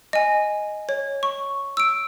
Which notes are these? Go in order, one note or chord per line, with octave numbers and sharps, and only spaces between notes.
D#5 G#5
C#5
C#6
E6 D7